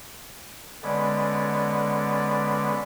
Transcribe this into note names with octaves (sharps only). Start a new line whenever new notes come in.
D3 G#3 B3 C#4 B4 D5